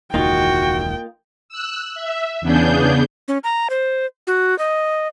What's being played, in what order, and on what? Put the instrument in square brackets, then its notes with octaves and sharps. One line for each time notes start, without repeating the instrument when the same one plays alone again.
[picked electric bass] E1 C#2 D#3 [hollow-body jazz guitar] A#3 D#4 F4 [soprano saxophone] F#4 [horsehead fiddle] G5
[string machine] E6 F#6
E5
E2 C#3 B3 D4 G#4 G6
[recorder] C#4
A#5
C5
F#4
D#5